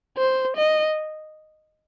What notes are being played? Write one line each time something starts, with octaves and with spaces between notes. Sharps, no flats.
C5
D#5